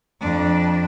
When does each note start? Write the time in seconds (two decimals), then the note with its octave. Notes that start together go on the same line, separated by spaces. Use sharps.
0.20 F2 D4